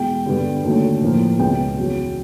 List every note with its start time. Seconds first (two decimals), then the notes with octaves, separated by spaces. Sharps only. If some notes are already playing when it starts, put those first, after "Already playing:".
Already playing: E2 B2 G#3 G5
0.26 G2 D3 G3 B3
0.63 D#2 D3 F#3 A3
1.01 A2 F3 A#3
1.39 C#2 B2 G#3 B3 G5
1.77 E2 C#3 F#3